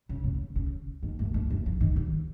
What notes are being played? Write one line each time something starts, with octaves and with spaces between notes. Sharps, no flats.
C#3
C#3
C#3
D#3
F#2
F2
F#2
F3
D#3
F2